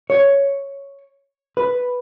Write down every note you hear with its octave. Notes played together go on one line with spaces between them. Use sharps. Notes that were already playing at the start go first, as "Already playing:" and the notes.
C#5
B4